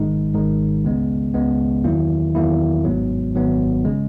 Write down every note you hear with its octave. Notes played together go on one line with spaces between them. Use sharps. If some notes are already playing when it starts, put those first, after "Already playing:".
Already playing: G#1 G#2 D#3 G#3 D#4
G#1 G#2 D#3 G#3 D#4
C#2 C#3 G#3 B3
C#2 C#3 G#3 B3
E2 D#3 F#3 A#3 E4
E2 D#3 F#3 A#3 E4
G#1 G#2 F#3 B3
G#1 G#2 F#3 B3
C#3 G#3